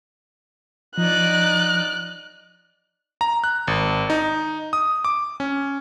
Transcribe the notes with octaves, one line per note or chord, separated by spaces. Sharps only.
F3 D#4 D5 F#6
A#5
F#6
G#1
D#4
D#6
D6
C#4